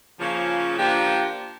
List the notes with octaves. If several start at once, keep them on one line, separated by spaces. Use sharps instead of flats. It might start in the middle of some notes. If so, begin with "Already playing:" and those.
C#3 F3 A#3
F3 A#3 D4 G4